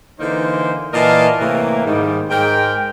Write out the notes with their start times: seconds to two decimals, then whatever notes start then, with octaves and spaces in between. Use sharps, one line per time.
0.19 D3 E3 A#3 D#4 C5
0.93 A#2 E3 A#4 D#5 F5 A5
1.39 A2 C3 E3 A#3
1.85 G#2 D#3 G3
2.29 G#2 G#3 A#4 G5